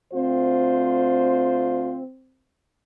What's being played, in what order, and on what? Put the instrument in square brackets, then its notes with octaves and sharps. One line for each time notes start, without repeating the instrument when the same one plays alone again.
[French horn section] D2 F4 C5 [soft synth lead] C4